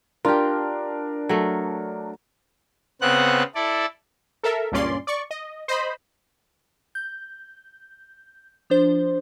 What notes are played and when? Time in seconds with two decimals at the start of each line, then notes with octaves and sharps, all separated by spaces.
0.25 D4 F4 G4 A#4
1.29 F#3 A3
3.01 C#3 B3 C4 F#5 F#6
3.55 E4 A4 D5
4.43 A4 A#4 E5
4.72 C#2 G2 A#2 C#4 D5 C6
5.07 D5 C#6
5.31 D#5
5.68 C5 D#5 B5
6.95 G6
8.70 F3 D4 C5